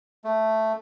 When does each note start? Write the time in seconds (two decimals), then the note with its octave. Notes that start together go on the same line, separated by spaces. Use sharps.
0.24 A3